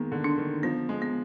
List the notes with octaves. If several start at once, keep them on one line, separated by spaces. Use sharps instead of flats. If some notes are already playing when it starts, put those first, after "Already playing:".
Already playing: D#3 G#3 A#3 B3
D3
D4
D#3
F3 B3
G#3
B3